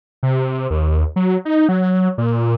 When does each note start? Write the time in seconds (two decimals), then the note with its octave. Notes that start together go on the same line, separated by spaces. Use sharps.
0.23 C3
0.70 D#2
1.16 F#3
1.45 D#4
1.69 F#3
2.18 A#2